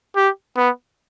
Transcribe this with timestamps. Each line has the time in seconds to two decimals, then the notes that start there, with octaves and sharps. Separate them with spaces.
0.16 G4
0.57 B3